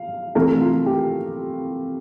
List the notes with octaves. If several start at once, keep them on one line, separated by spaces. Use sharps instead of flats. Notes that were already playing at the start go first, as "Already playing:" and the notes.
Already playing: F5
C3 E3 A3 A#4
F4
G4